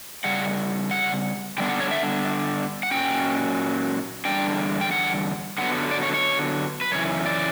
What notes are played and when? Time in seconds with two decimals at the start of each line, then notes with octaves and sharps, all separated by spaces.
0.24 C#3 G3 F#5
0.91 F#5
1.58 D3 G3 B3 D4 G5
1.69 F#5
1.80 C#5
1.91 E5
2.83 F#5
2.91 A#2 F#3 C#4 G5
4.25 E2 D3 G3 D4 G5
4.81 G5
4.91 F#5
5.58 D3 F#3 B3 F#5
5.91 D5
6.03 C#5
6.14 C#5
6.81 B4
6.91 F#2 C#3 E3 C#5
7.26 D5